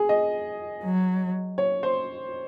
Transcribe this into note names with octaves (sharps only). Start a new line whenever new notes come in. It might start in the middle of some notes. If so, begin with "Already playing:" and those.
Already playing: G#4
D#5
F#3
C#5
C5